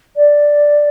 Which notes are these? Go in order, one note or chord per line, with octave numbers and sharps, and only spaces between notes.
D5